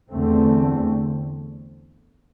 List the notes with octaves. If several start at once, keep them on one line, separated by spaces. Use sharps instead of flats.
E2 D3 A3 C4